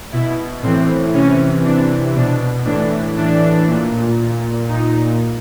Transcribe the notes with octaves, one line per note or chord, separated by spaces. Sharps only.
B2 E4
A2 E3 C4
C3 E3 C#4
C3 E3 D4
B2 D4
A2 E3 D4
A2 E3 D4
A#2
A#2
A#2 D#4